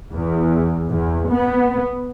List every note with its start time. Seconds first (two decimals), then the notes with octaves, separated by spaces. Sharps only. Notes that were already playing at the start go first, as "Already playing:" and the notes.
0.12 E2
0.89 E2
1.29 B3